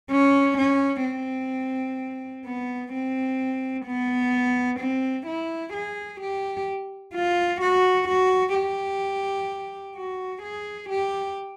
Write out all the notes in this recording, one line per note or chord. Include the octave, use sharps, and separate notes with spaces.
C#4
C#4
C4
B3
C4
B3
C4
E4
G#4
G4
F4
F#4
F#4
G4
F#4
G#4
G4